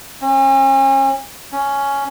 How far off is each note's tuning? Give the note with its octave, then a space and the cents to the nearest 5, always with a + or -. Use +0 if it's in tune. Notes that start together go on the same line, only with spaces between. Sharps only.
C#4 -40
C#4 +5